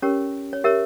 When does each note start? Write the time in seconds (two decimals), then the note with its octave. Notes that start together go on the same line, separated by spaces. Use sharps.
0.02 C#4 G4 A#4 C#5
0.53 C#5
0.64 G4 A#4 C#5 E5